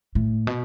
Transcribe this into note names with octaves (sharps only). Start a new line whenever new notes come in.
A2
B2